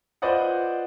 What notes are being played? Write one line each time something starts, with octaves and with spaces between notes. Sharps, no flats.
F4 B4 C5 D5 D#5 F#5